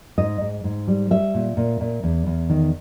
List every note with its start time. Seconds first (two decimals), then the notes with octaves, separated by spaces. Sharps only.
0.18 G#2 D#5
0.41 G#2
0.64 G#2
0.88 G3
1.10 G3 E5
1.34 A#2
1.57 A#2
1.81 A#2
2.03 E2
2.27 E2
2.50 D#3